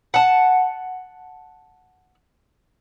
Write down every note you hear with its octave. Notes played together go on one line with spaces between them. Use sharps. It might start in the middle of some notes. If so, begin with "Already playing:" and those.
F#5 A5